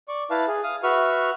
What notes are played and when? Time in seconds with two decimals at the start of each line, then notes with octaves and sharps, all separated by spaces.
0.08 D5 C#6
0.30 E4 B4 F5 A5
0.47 G#4
0.63 F5 D#6
0.83 F#4 B4 E5 C#6 F6